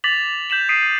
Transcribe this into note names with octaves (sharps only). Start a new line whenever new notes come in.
D6 A6 B6 F7 F#7
G6 B6 E7 F#7
D#6 G6 B6 C7 D7 D#7